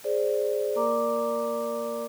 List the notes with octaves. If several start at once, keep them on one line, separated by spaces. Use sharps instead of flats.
G#4 C5 D5
A#3 A#4 D5 A#5 D6